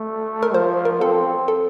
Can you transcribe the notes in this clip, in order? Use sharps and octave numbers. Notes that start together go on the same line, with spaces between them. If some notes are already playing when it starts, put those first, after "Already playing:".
Already playing: A3
A#4
F3 C5
A#4
C4 A4
A4